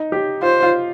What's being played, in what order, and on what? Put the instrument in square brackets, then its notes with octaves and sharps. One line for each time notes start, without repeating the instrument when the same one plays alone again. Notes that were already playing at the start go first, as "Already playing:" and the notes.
Already playing: [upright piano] D#4
G4
[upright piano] F4 [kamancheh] C5
[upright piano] F4